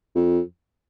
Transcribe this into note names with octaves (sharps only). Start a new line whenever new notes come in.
F2